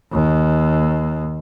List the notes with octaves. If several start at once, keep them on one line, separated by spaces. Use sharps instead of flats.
D#2